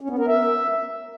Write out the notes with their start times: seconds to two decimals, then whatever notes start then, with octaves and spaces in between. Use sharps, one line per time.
0.01 C#4
0.10 B3
0.19 A#4
0.27 E5